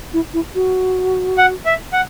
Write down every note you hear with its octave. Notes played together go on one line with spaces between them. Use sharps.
E4
E4
F#4
F#5
E5
F#5